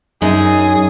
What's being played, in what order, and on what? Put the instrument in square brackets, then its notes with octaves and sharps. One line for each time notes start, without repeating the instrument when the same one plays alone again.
[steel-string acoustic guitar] F#2 [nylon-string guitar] D#4 [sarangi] G#4